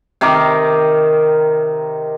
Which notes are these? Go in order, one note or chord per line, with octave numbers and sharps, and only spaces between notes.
C3 D#3 A#4 D6